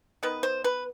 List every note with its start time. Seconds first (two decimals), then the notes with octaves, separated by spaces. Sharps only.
0.23 D#3 B3 B4
0.43 C5
0.64 B4